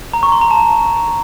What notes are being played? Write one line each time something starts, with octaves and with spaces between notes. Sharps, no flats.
A#5
C#6
C6
A#5
A5